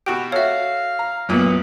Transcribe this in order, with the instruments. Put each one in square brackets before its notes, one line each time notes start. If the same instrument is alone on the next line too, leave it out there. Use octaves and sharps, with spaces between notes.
[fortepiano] B2 F#4 G4 [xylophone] D7
[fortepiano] F#4 A4 [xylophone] C#5 E5 [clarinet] F5
[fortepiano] A#5
[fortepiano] A1 A#2 [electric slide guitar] F#2 B3